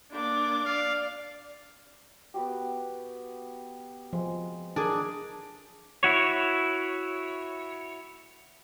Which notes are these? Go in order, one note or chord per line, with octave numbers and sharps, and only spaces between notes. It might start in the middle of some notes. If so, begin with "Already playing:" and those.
A#3 D4 D6
D5 F5
B3 F#4 G4
F3 G#3
D4 G#4 A#4
E4 F#4 C#5